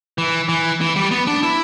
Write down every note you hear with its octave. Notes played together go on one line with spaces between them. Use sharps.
E3
E3
E3
G3
B3
D4
E4